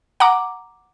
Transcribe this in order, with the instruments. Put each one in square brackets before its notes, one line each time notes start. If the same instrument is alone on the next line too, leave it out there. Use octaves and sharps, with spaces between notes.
[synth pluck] F#5 A#5 D6